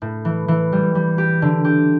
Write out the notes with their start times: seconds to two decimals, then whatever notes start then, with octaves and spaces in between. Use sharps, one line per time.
0.02 A2
0.25 E3
0.48 E3
0.72 G3
0.95 G3
1.18 G4
1.42 D3
1.65 G4